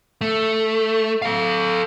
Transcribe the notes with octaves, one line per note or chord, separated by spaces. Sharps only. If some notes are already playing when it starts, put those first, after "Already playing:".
A3
A4 F5